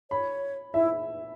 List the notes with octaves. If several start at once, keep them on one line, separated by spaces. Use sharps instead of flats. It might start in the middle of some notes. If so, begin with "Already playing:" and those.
C#5 B5
E4 E5